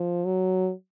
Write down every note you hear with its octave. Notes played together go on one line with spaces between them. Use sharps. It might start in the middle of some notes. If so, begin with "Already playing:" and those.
Already playing: F3
F#3